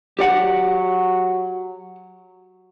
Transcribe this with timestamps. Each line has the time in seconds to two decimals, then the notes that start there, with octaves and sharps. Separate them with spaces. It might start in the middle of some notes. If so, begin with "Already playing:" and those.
0.19 F#3 G4 D5 F#5